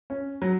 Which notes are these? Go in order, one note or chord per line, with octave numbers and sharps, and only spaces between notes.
C#4
F#3